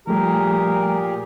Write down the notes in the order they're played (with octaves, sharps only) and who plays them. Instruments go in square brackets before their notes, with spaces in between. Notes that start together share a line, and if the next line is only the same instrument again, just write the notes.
[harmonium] A#2 G4 G#4 [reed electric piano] F3 G3 A3 [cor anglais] A#4